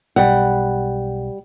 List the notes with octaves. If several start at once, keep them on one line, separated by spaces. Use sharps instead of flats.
B1 G3 F#5